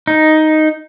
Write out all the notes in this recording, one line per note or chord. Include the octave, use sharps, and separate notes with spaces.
D#4